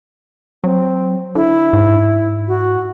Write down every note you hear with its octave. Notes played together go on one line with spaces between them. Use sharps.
F#3 C4
D3 E4
G#2
F#4